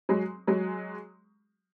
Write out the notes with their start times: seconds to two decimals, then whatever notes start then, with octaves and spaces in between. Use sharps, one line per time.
0.09 F#3 G#3
0.47 F#3 G#3